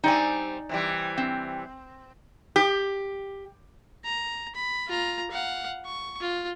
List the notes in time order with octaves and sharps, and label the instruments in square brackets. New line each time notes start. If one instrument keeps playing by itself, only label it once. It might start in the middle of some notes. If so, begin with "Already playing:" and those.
[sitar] G3 C4 [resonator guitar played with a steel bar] D#4 D5 G#5
[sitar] C3 E3 G3
[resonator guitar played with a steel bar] C4
G4
[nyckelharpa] A#5
B5
F4 A#5
F5 F#5
C#6
F4